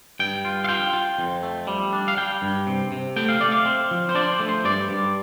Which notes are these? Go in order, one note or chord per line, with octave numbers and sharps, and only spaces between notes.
G2 G5
F4
F5
F4 G5
F4
F2
A3
G3
D4
F5
G3 G5
G2
C3
C3
A3 G5
F5
A3 D5
F5
C4
F3
C5
D4 D5
C5
A3
C5
G2 D5
G2